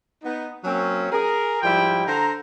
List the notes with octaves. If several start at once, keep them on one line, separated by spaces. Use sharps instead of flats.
B3 D#4
F#3 A#3 C4 C#4
G#4 A#4
G#2 F3 G3 E4 F4 G5
D3 A4 C5 A#5